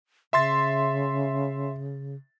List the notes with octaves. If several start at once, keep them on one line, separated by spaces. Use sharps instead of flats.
C#3 E5 C6 A6